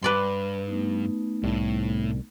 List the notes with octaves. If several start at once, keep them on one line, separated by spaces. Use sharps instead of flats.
G2 B4 D5 C6
A3 B3 D#4
C2 A2